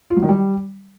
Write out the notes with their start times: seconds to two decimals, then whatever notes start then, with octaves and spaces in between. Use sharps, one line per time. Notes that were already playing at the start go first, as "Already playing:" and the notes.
0.10 F4
0.16 F#3
0.23 D#3
0.29 G3